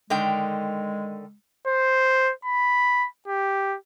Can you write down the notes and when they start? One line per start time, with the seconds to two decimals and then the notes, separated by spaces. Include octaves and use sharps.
0.10 D3 D#3 G#3 G5
1.68 C5
2.45 B5
3.28 G4